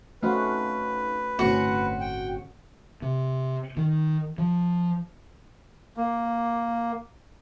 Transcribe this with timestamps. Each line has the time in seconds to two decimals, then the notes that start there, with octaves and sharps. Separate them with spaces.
0.23 A3 C4 C#4 D#4 F#4 B4 F5
1.39 G1 A2 D3 C4 C#4 F#4 C#7
2.01 G5
3.02 C3
3.77 D#3
4.38 F3
5.97 A#3